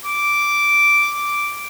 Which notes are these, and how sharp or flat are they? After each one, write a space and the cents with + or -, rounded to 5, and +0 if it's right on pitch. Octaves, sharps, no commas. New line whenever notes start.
D6 -5